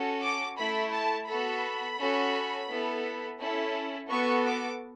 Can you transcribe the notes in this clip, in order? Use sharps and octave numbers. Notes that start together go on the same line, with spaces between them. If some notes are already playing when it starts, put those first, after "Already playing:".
Already playing: C#4 F#4 A4
D6
A3 E4 A4 B5
A5
B3 F#4 A4 B5
C#4 F#4 A4
B3 E4 A4
C#4 E4 A4
B3 F#4 A4 C#6
D6